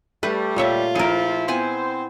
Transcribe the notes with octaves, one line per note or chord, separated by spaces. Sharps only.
G3 A3 B4
A#2 F4 C#5 E5
F3 E4 G#4 A#4
B3 C4 E4 C5 G#5